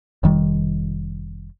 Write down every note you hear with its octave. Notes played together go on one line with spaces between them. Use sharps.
F1 D#3 G3